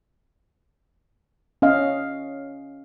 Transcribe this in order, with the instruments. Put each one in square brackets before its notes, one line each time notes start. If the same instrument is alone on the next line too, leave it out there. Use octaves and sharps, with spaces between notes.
[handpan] C#4 D#5 F5